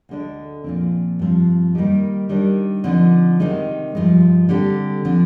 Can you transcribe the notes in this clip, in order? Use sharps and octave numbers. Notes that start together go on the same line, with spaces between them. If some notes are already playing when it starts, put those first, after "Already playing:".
D2 D3 G#3 D4
A#2 F3 C4
G2 F3 C4
D#3 G3 A#3 D#4 G4
D#3 G3 D4
D3 F3 C4 D#4
C3 D#3 G#3 D#4
G2 F3 G#3
D3 G3 C4 G4
D3 F3 C4